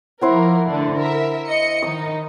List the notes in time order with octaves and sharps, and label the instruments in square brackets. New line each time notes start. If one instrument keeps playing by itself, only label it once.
[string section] F3 A#3 A#4 [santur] E4 C5 F#5
[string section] D3 A3 D4
A#4 E5
D#5 C#7
[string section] D#3 D#4 [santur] D#6